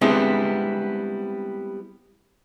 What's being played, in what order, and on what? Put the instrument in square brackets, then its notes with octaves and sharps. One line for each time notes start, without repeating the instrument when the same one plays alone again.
[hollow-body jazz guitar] G3 G#3 B3 C4 D4 E4